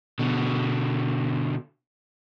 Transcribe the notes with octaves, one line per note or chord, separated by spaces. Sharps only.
B2 D3